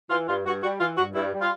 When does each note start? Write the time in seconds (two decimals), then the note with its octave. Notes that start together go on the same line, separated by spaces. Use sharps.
0.10 E3 F4
0.27 G2 F4
0.45 G2 F#4
0.62 G3 F#4
0.80 E3 F4
0.97 G2 F#4
1.14 G2 E4
1.33 G3
1.41 F4